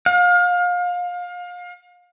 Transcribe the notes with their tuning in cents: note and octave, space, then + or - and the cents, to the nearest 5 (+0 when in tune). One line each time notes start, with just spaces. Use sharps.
F5 +30